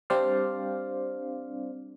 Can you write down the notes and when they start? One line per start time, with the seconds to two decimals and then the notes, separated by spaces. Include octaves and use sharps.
0.10 G3 C4 D4 C5 D5 F5